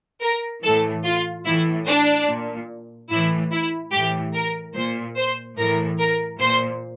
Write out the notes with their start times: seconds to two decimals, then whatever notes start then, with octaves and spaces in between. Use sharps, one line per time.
0.21 A#4
0.63 A2 E3 A4
1.05 F4
1.45 A2 E3 E4
1.87 D4
2.27 A#2
3.10 A2 E3 E4
3.51 E4
3.92 A2 E3 G4
4.34 A#4
4.74 A#2 C5
5.16 C5
5.57 A2 E3 A#4
5.99 A#4
6.39 A#2 C5